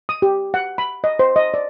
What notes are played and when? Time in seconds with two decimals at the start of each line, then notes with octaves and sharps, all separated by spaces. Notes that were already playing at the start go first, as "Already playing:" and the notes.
0.09 D#6
0.22 G4
0.54 F#5
0.78 B5
1.04 D#5
1.19 C5
1.36 D#5
1.54 D5